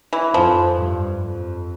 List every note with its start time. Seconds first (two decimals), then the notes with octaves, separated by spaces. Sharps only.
0.13 E3
0.34 F2 F3
0.77 G2
1.20 F2